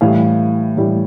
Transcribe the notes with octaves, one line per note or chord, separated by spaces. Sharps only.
A2 E3 G3 F5
A2 E3 G3